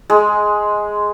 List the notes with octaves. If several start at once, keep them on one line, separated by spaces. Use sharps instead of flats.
G#3